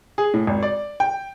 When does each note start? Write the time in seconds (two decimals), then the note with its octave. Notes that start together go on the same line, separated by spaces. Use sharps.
0.18 G#4
0.34 A2
0.47 G#1
0.63 D5
1.00 G5